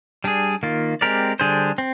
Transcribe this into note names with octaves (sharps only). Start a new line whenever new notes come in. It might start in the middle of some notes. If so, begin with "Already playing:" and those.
G3 D4 G#4
D#3 A#3 F4
G#3 C4 G4 A#4 D5
D3 G3 D4 G#4 C5
C4